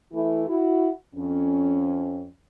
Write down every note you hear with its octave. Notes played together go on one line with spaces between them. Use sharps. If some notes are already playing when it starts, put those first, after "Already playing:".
E3 A3 E4
E4 F#4
F2 C#4